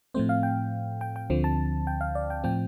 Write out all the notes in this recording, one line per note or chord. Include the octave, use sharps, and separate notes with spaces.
A2 F3 A3 C4 C5
F5
G5
G5
G5
D2 D3 F3 C4
A5
G5
F5
D5
G5
A2 F3 C4 G5